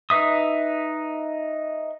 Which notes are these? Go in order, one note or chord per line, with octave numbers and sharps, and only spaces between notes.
D#4 B4 E5 D#6